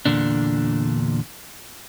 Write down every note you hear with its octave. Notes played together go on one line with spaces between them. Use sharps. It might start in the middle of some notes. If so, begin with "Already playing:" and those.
E2 A#2 D3 D4